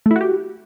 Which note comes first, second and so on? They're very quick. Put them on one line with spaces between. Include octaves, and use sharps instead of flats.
A3 E4 F#4 G4